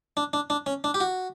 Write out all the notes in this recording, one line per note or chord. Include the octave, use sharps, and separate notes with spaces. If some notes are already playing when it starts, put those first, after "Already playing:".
D4
D4
D4
C#4
D4
G4
F#4